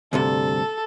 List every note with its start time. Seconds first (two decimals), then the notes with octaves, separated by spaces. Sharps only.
0.13 D2 G2 C3 A4